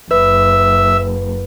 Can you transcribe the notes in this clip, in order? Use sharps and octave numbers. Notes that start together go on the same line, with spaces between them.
F#1 B4 E5